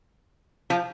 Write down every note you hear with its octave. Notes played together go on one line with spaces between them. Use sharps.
F3